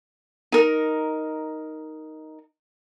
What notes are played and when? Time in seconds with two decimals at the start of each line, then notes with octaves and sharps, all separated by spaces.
0.52 D#4 A#4